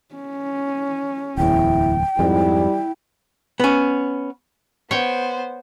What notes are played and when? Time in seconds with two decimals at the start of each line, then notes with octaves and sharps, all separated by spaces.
0.14 C#4
1.37 D1 E2 E4 G5
2.19 F2 G#2 G3 E4
3.60 B3 C#4
4.91 B3 C5 C#5 G5